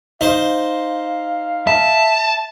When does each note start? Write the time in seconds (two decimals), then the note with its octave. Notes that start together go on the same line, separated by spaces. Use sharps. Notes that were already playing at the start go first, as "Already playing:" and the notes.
0.21 D#4 C5 F5
1.67 E5 A5